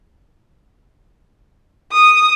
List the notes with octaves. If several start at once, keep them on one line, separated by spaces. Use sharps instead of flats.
D#6